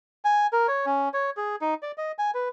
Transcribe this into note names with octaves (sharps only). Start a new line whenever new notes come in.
G#5
A#4
C#5
C#4
C#5
G#4
D#4
D5
D#5
G#5
B4